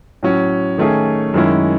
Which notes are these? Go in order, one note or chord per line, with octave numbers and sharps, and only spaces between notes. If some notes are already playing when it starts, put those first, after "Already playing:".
A2 F#3 C#4
D#3 A3 C#4 G#4
F#2 D#3 G#3 C#4 E4